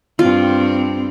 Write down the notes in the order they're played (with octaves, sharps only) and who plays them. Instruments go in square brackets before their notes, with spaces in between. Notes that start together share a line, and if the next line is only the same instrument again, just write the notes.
[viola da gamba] G2 C4 [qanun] F4